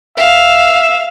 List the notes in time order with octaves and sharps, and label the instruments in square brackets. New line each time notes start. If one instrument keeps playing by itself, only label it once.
[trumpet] E5 [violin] F5